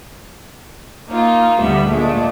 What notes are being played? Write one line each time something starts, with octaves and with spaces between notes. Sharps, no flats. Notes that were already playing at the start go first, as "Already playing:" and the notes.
A#3 D#4 F4
D2 D3 G3 B3 E5
A#2 G#3 A3 D4